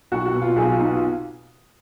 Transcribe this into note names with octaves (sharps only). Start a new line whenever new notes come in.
B1 F#4
F#4
B2
F4
B1 G#4
F4
B2 D#4
F4